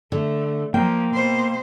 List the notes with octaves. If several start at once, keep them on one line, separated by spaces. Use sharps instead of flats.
D3 A3
F3 A#3 G5
B2 C5